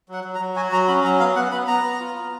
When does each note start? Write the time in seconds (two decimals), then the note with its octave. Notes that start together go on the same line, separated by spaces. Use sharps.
0.09 F#3 F#5
0.24 F#3
0.35 A#5
0.40 F#3
0.56 F#4 G#5
0.72 F#3 A#5
0.88 C#4 B5
1.04 F#3 A#5
1.20 B3 F5
1.36 B3 F#5
1.52 B3 B5
1.67 B3 A#5
1.84 B3
2.00 F4
2.16 B3